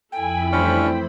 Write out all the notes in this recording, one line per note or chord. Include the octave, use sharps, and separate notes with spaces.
F2 E4 A4 G5 G#5 B5
E3 G3 A3 C#4 D4 C5